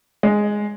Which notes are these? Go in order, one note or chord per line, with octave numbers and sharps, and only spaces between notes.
G#3